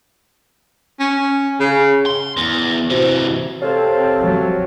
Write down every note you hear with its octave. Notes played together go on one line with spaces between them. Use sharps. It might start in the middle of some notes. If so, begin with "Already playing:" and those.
C#4
C#3
C6
E2
C3 E3 F#4 C5
C3 C4 A4 C#5 F5 A5
F#3